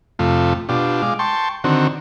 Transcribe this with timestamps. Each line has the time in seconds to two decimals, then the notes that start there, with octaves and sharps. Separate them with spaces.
0.19 F2 C3 A3 F4
0.69 B2 D4 F4 G4
1.02 G#3 F5 D6
1.19 G5 A5 C6 C#6
1.64 D3 D#3 C4 F#4